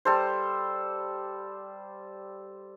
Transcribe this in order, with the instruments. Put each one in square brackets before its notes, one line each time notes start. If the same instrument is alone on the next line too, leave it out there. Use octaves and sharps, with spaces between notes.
[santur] G3 A4 C5